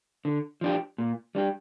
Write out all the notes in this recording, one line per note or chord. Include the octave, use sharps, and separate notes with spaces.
D3
F3 D4 G4
A#2
G3 D4 G4